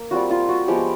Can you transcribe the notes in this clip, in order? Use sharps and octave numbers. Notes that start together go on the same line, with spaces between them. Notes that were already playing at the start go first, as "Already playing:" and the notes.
Already playing: A#3
G3 C4 F4 F#4
F4
F#4
F3 G#3 B3 G4